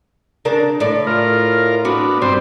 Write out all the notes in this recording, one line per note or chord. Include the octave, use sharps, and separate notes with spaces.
C#3 D4 A#4
A2 D5
F4 A#4
B3 D4 F#4
G2 G3 C4 C5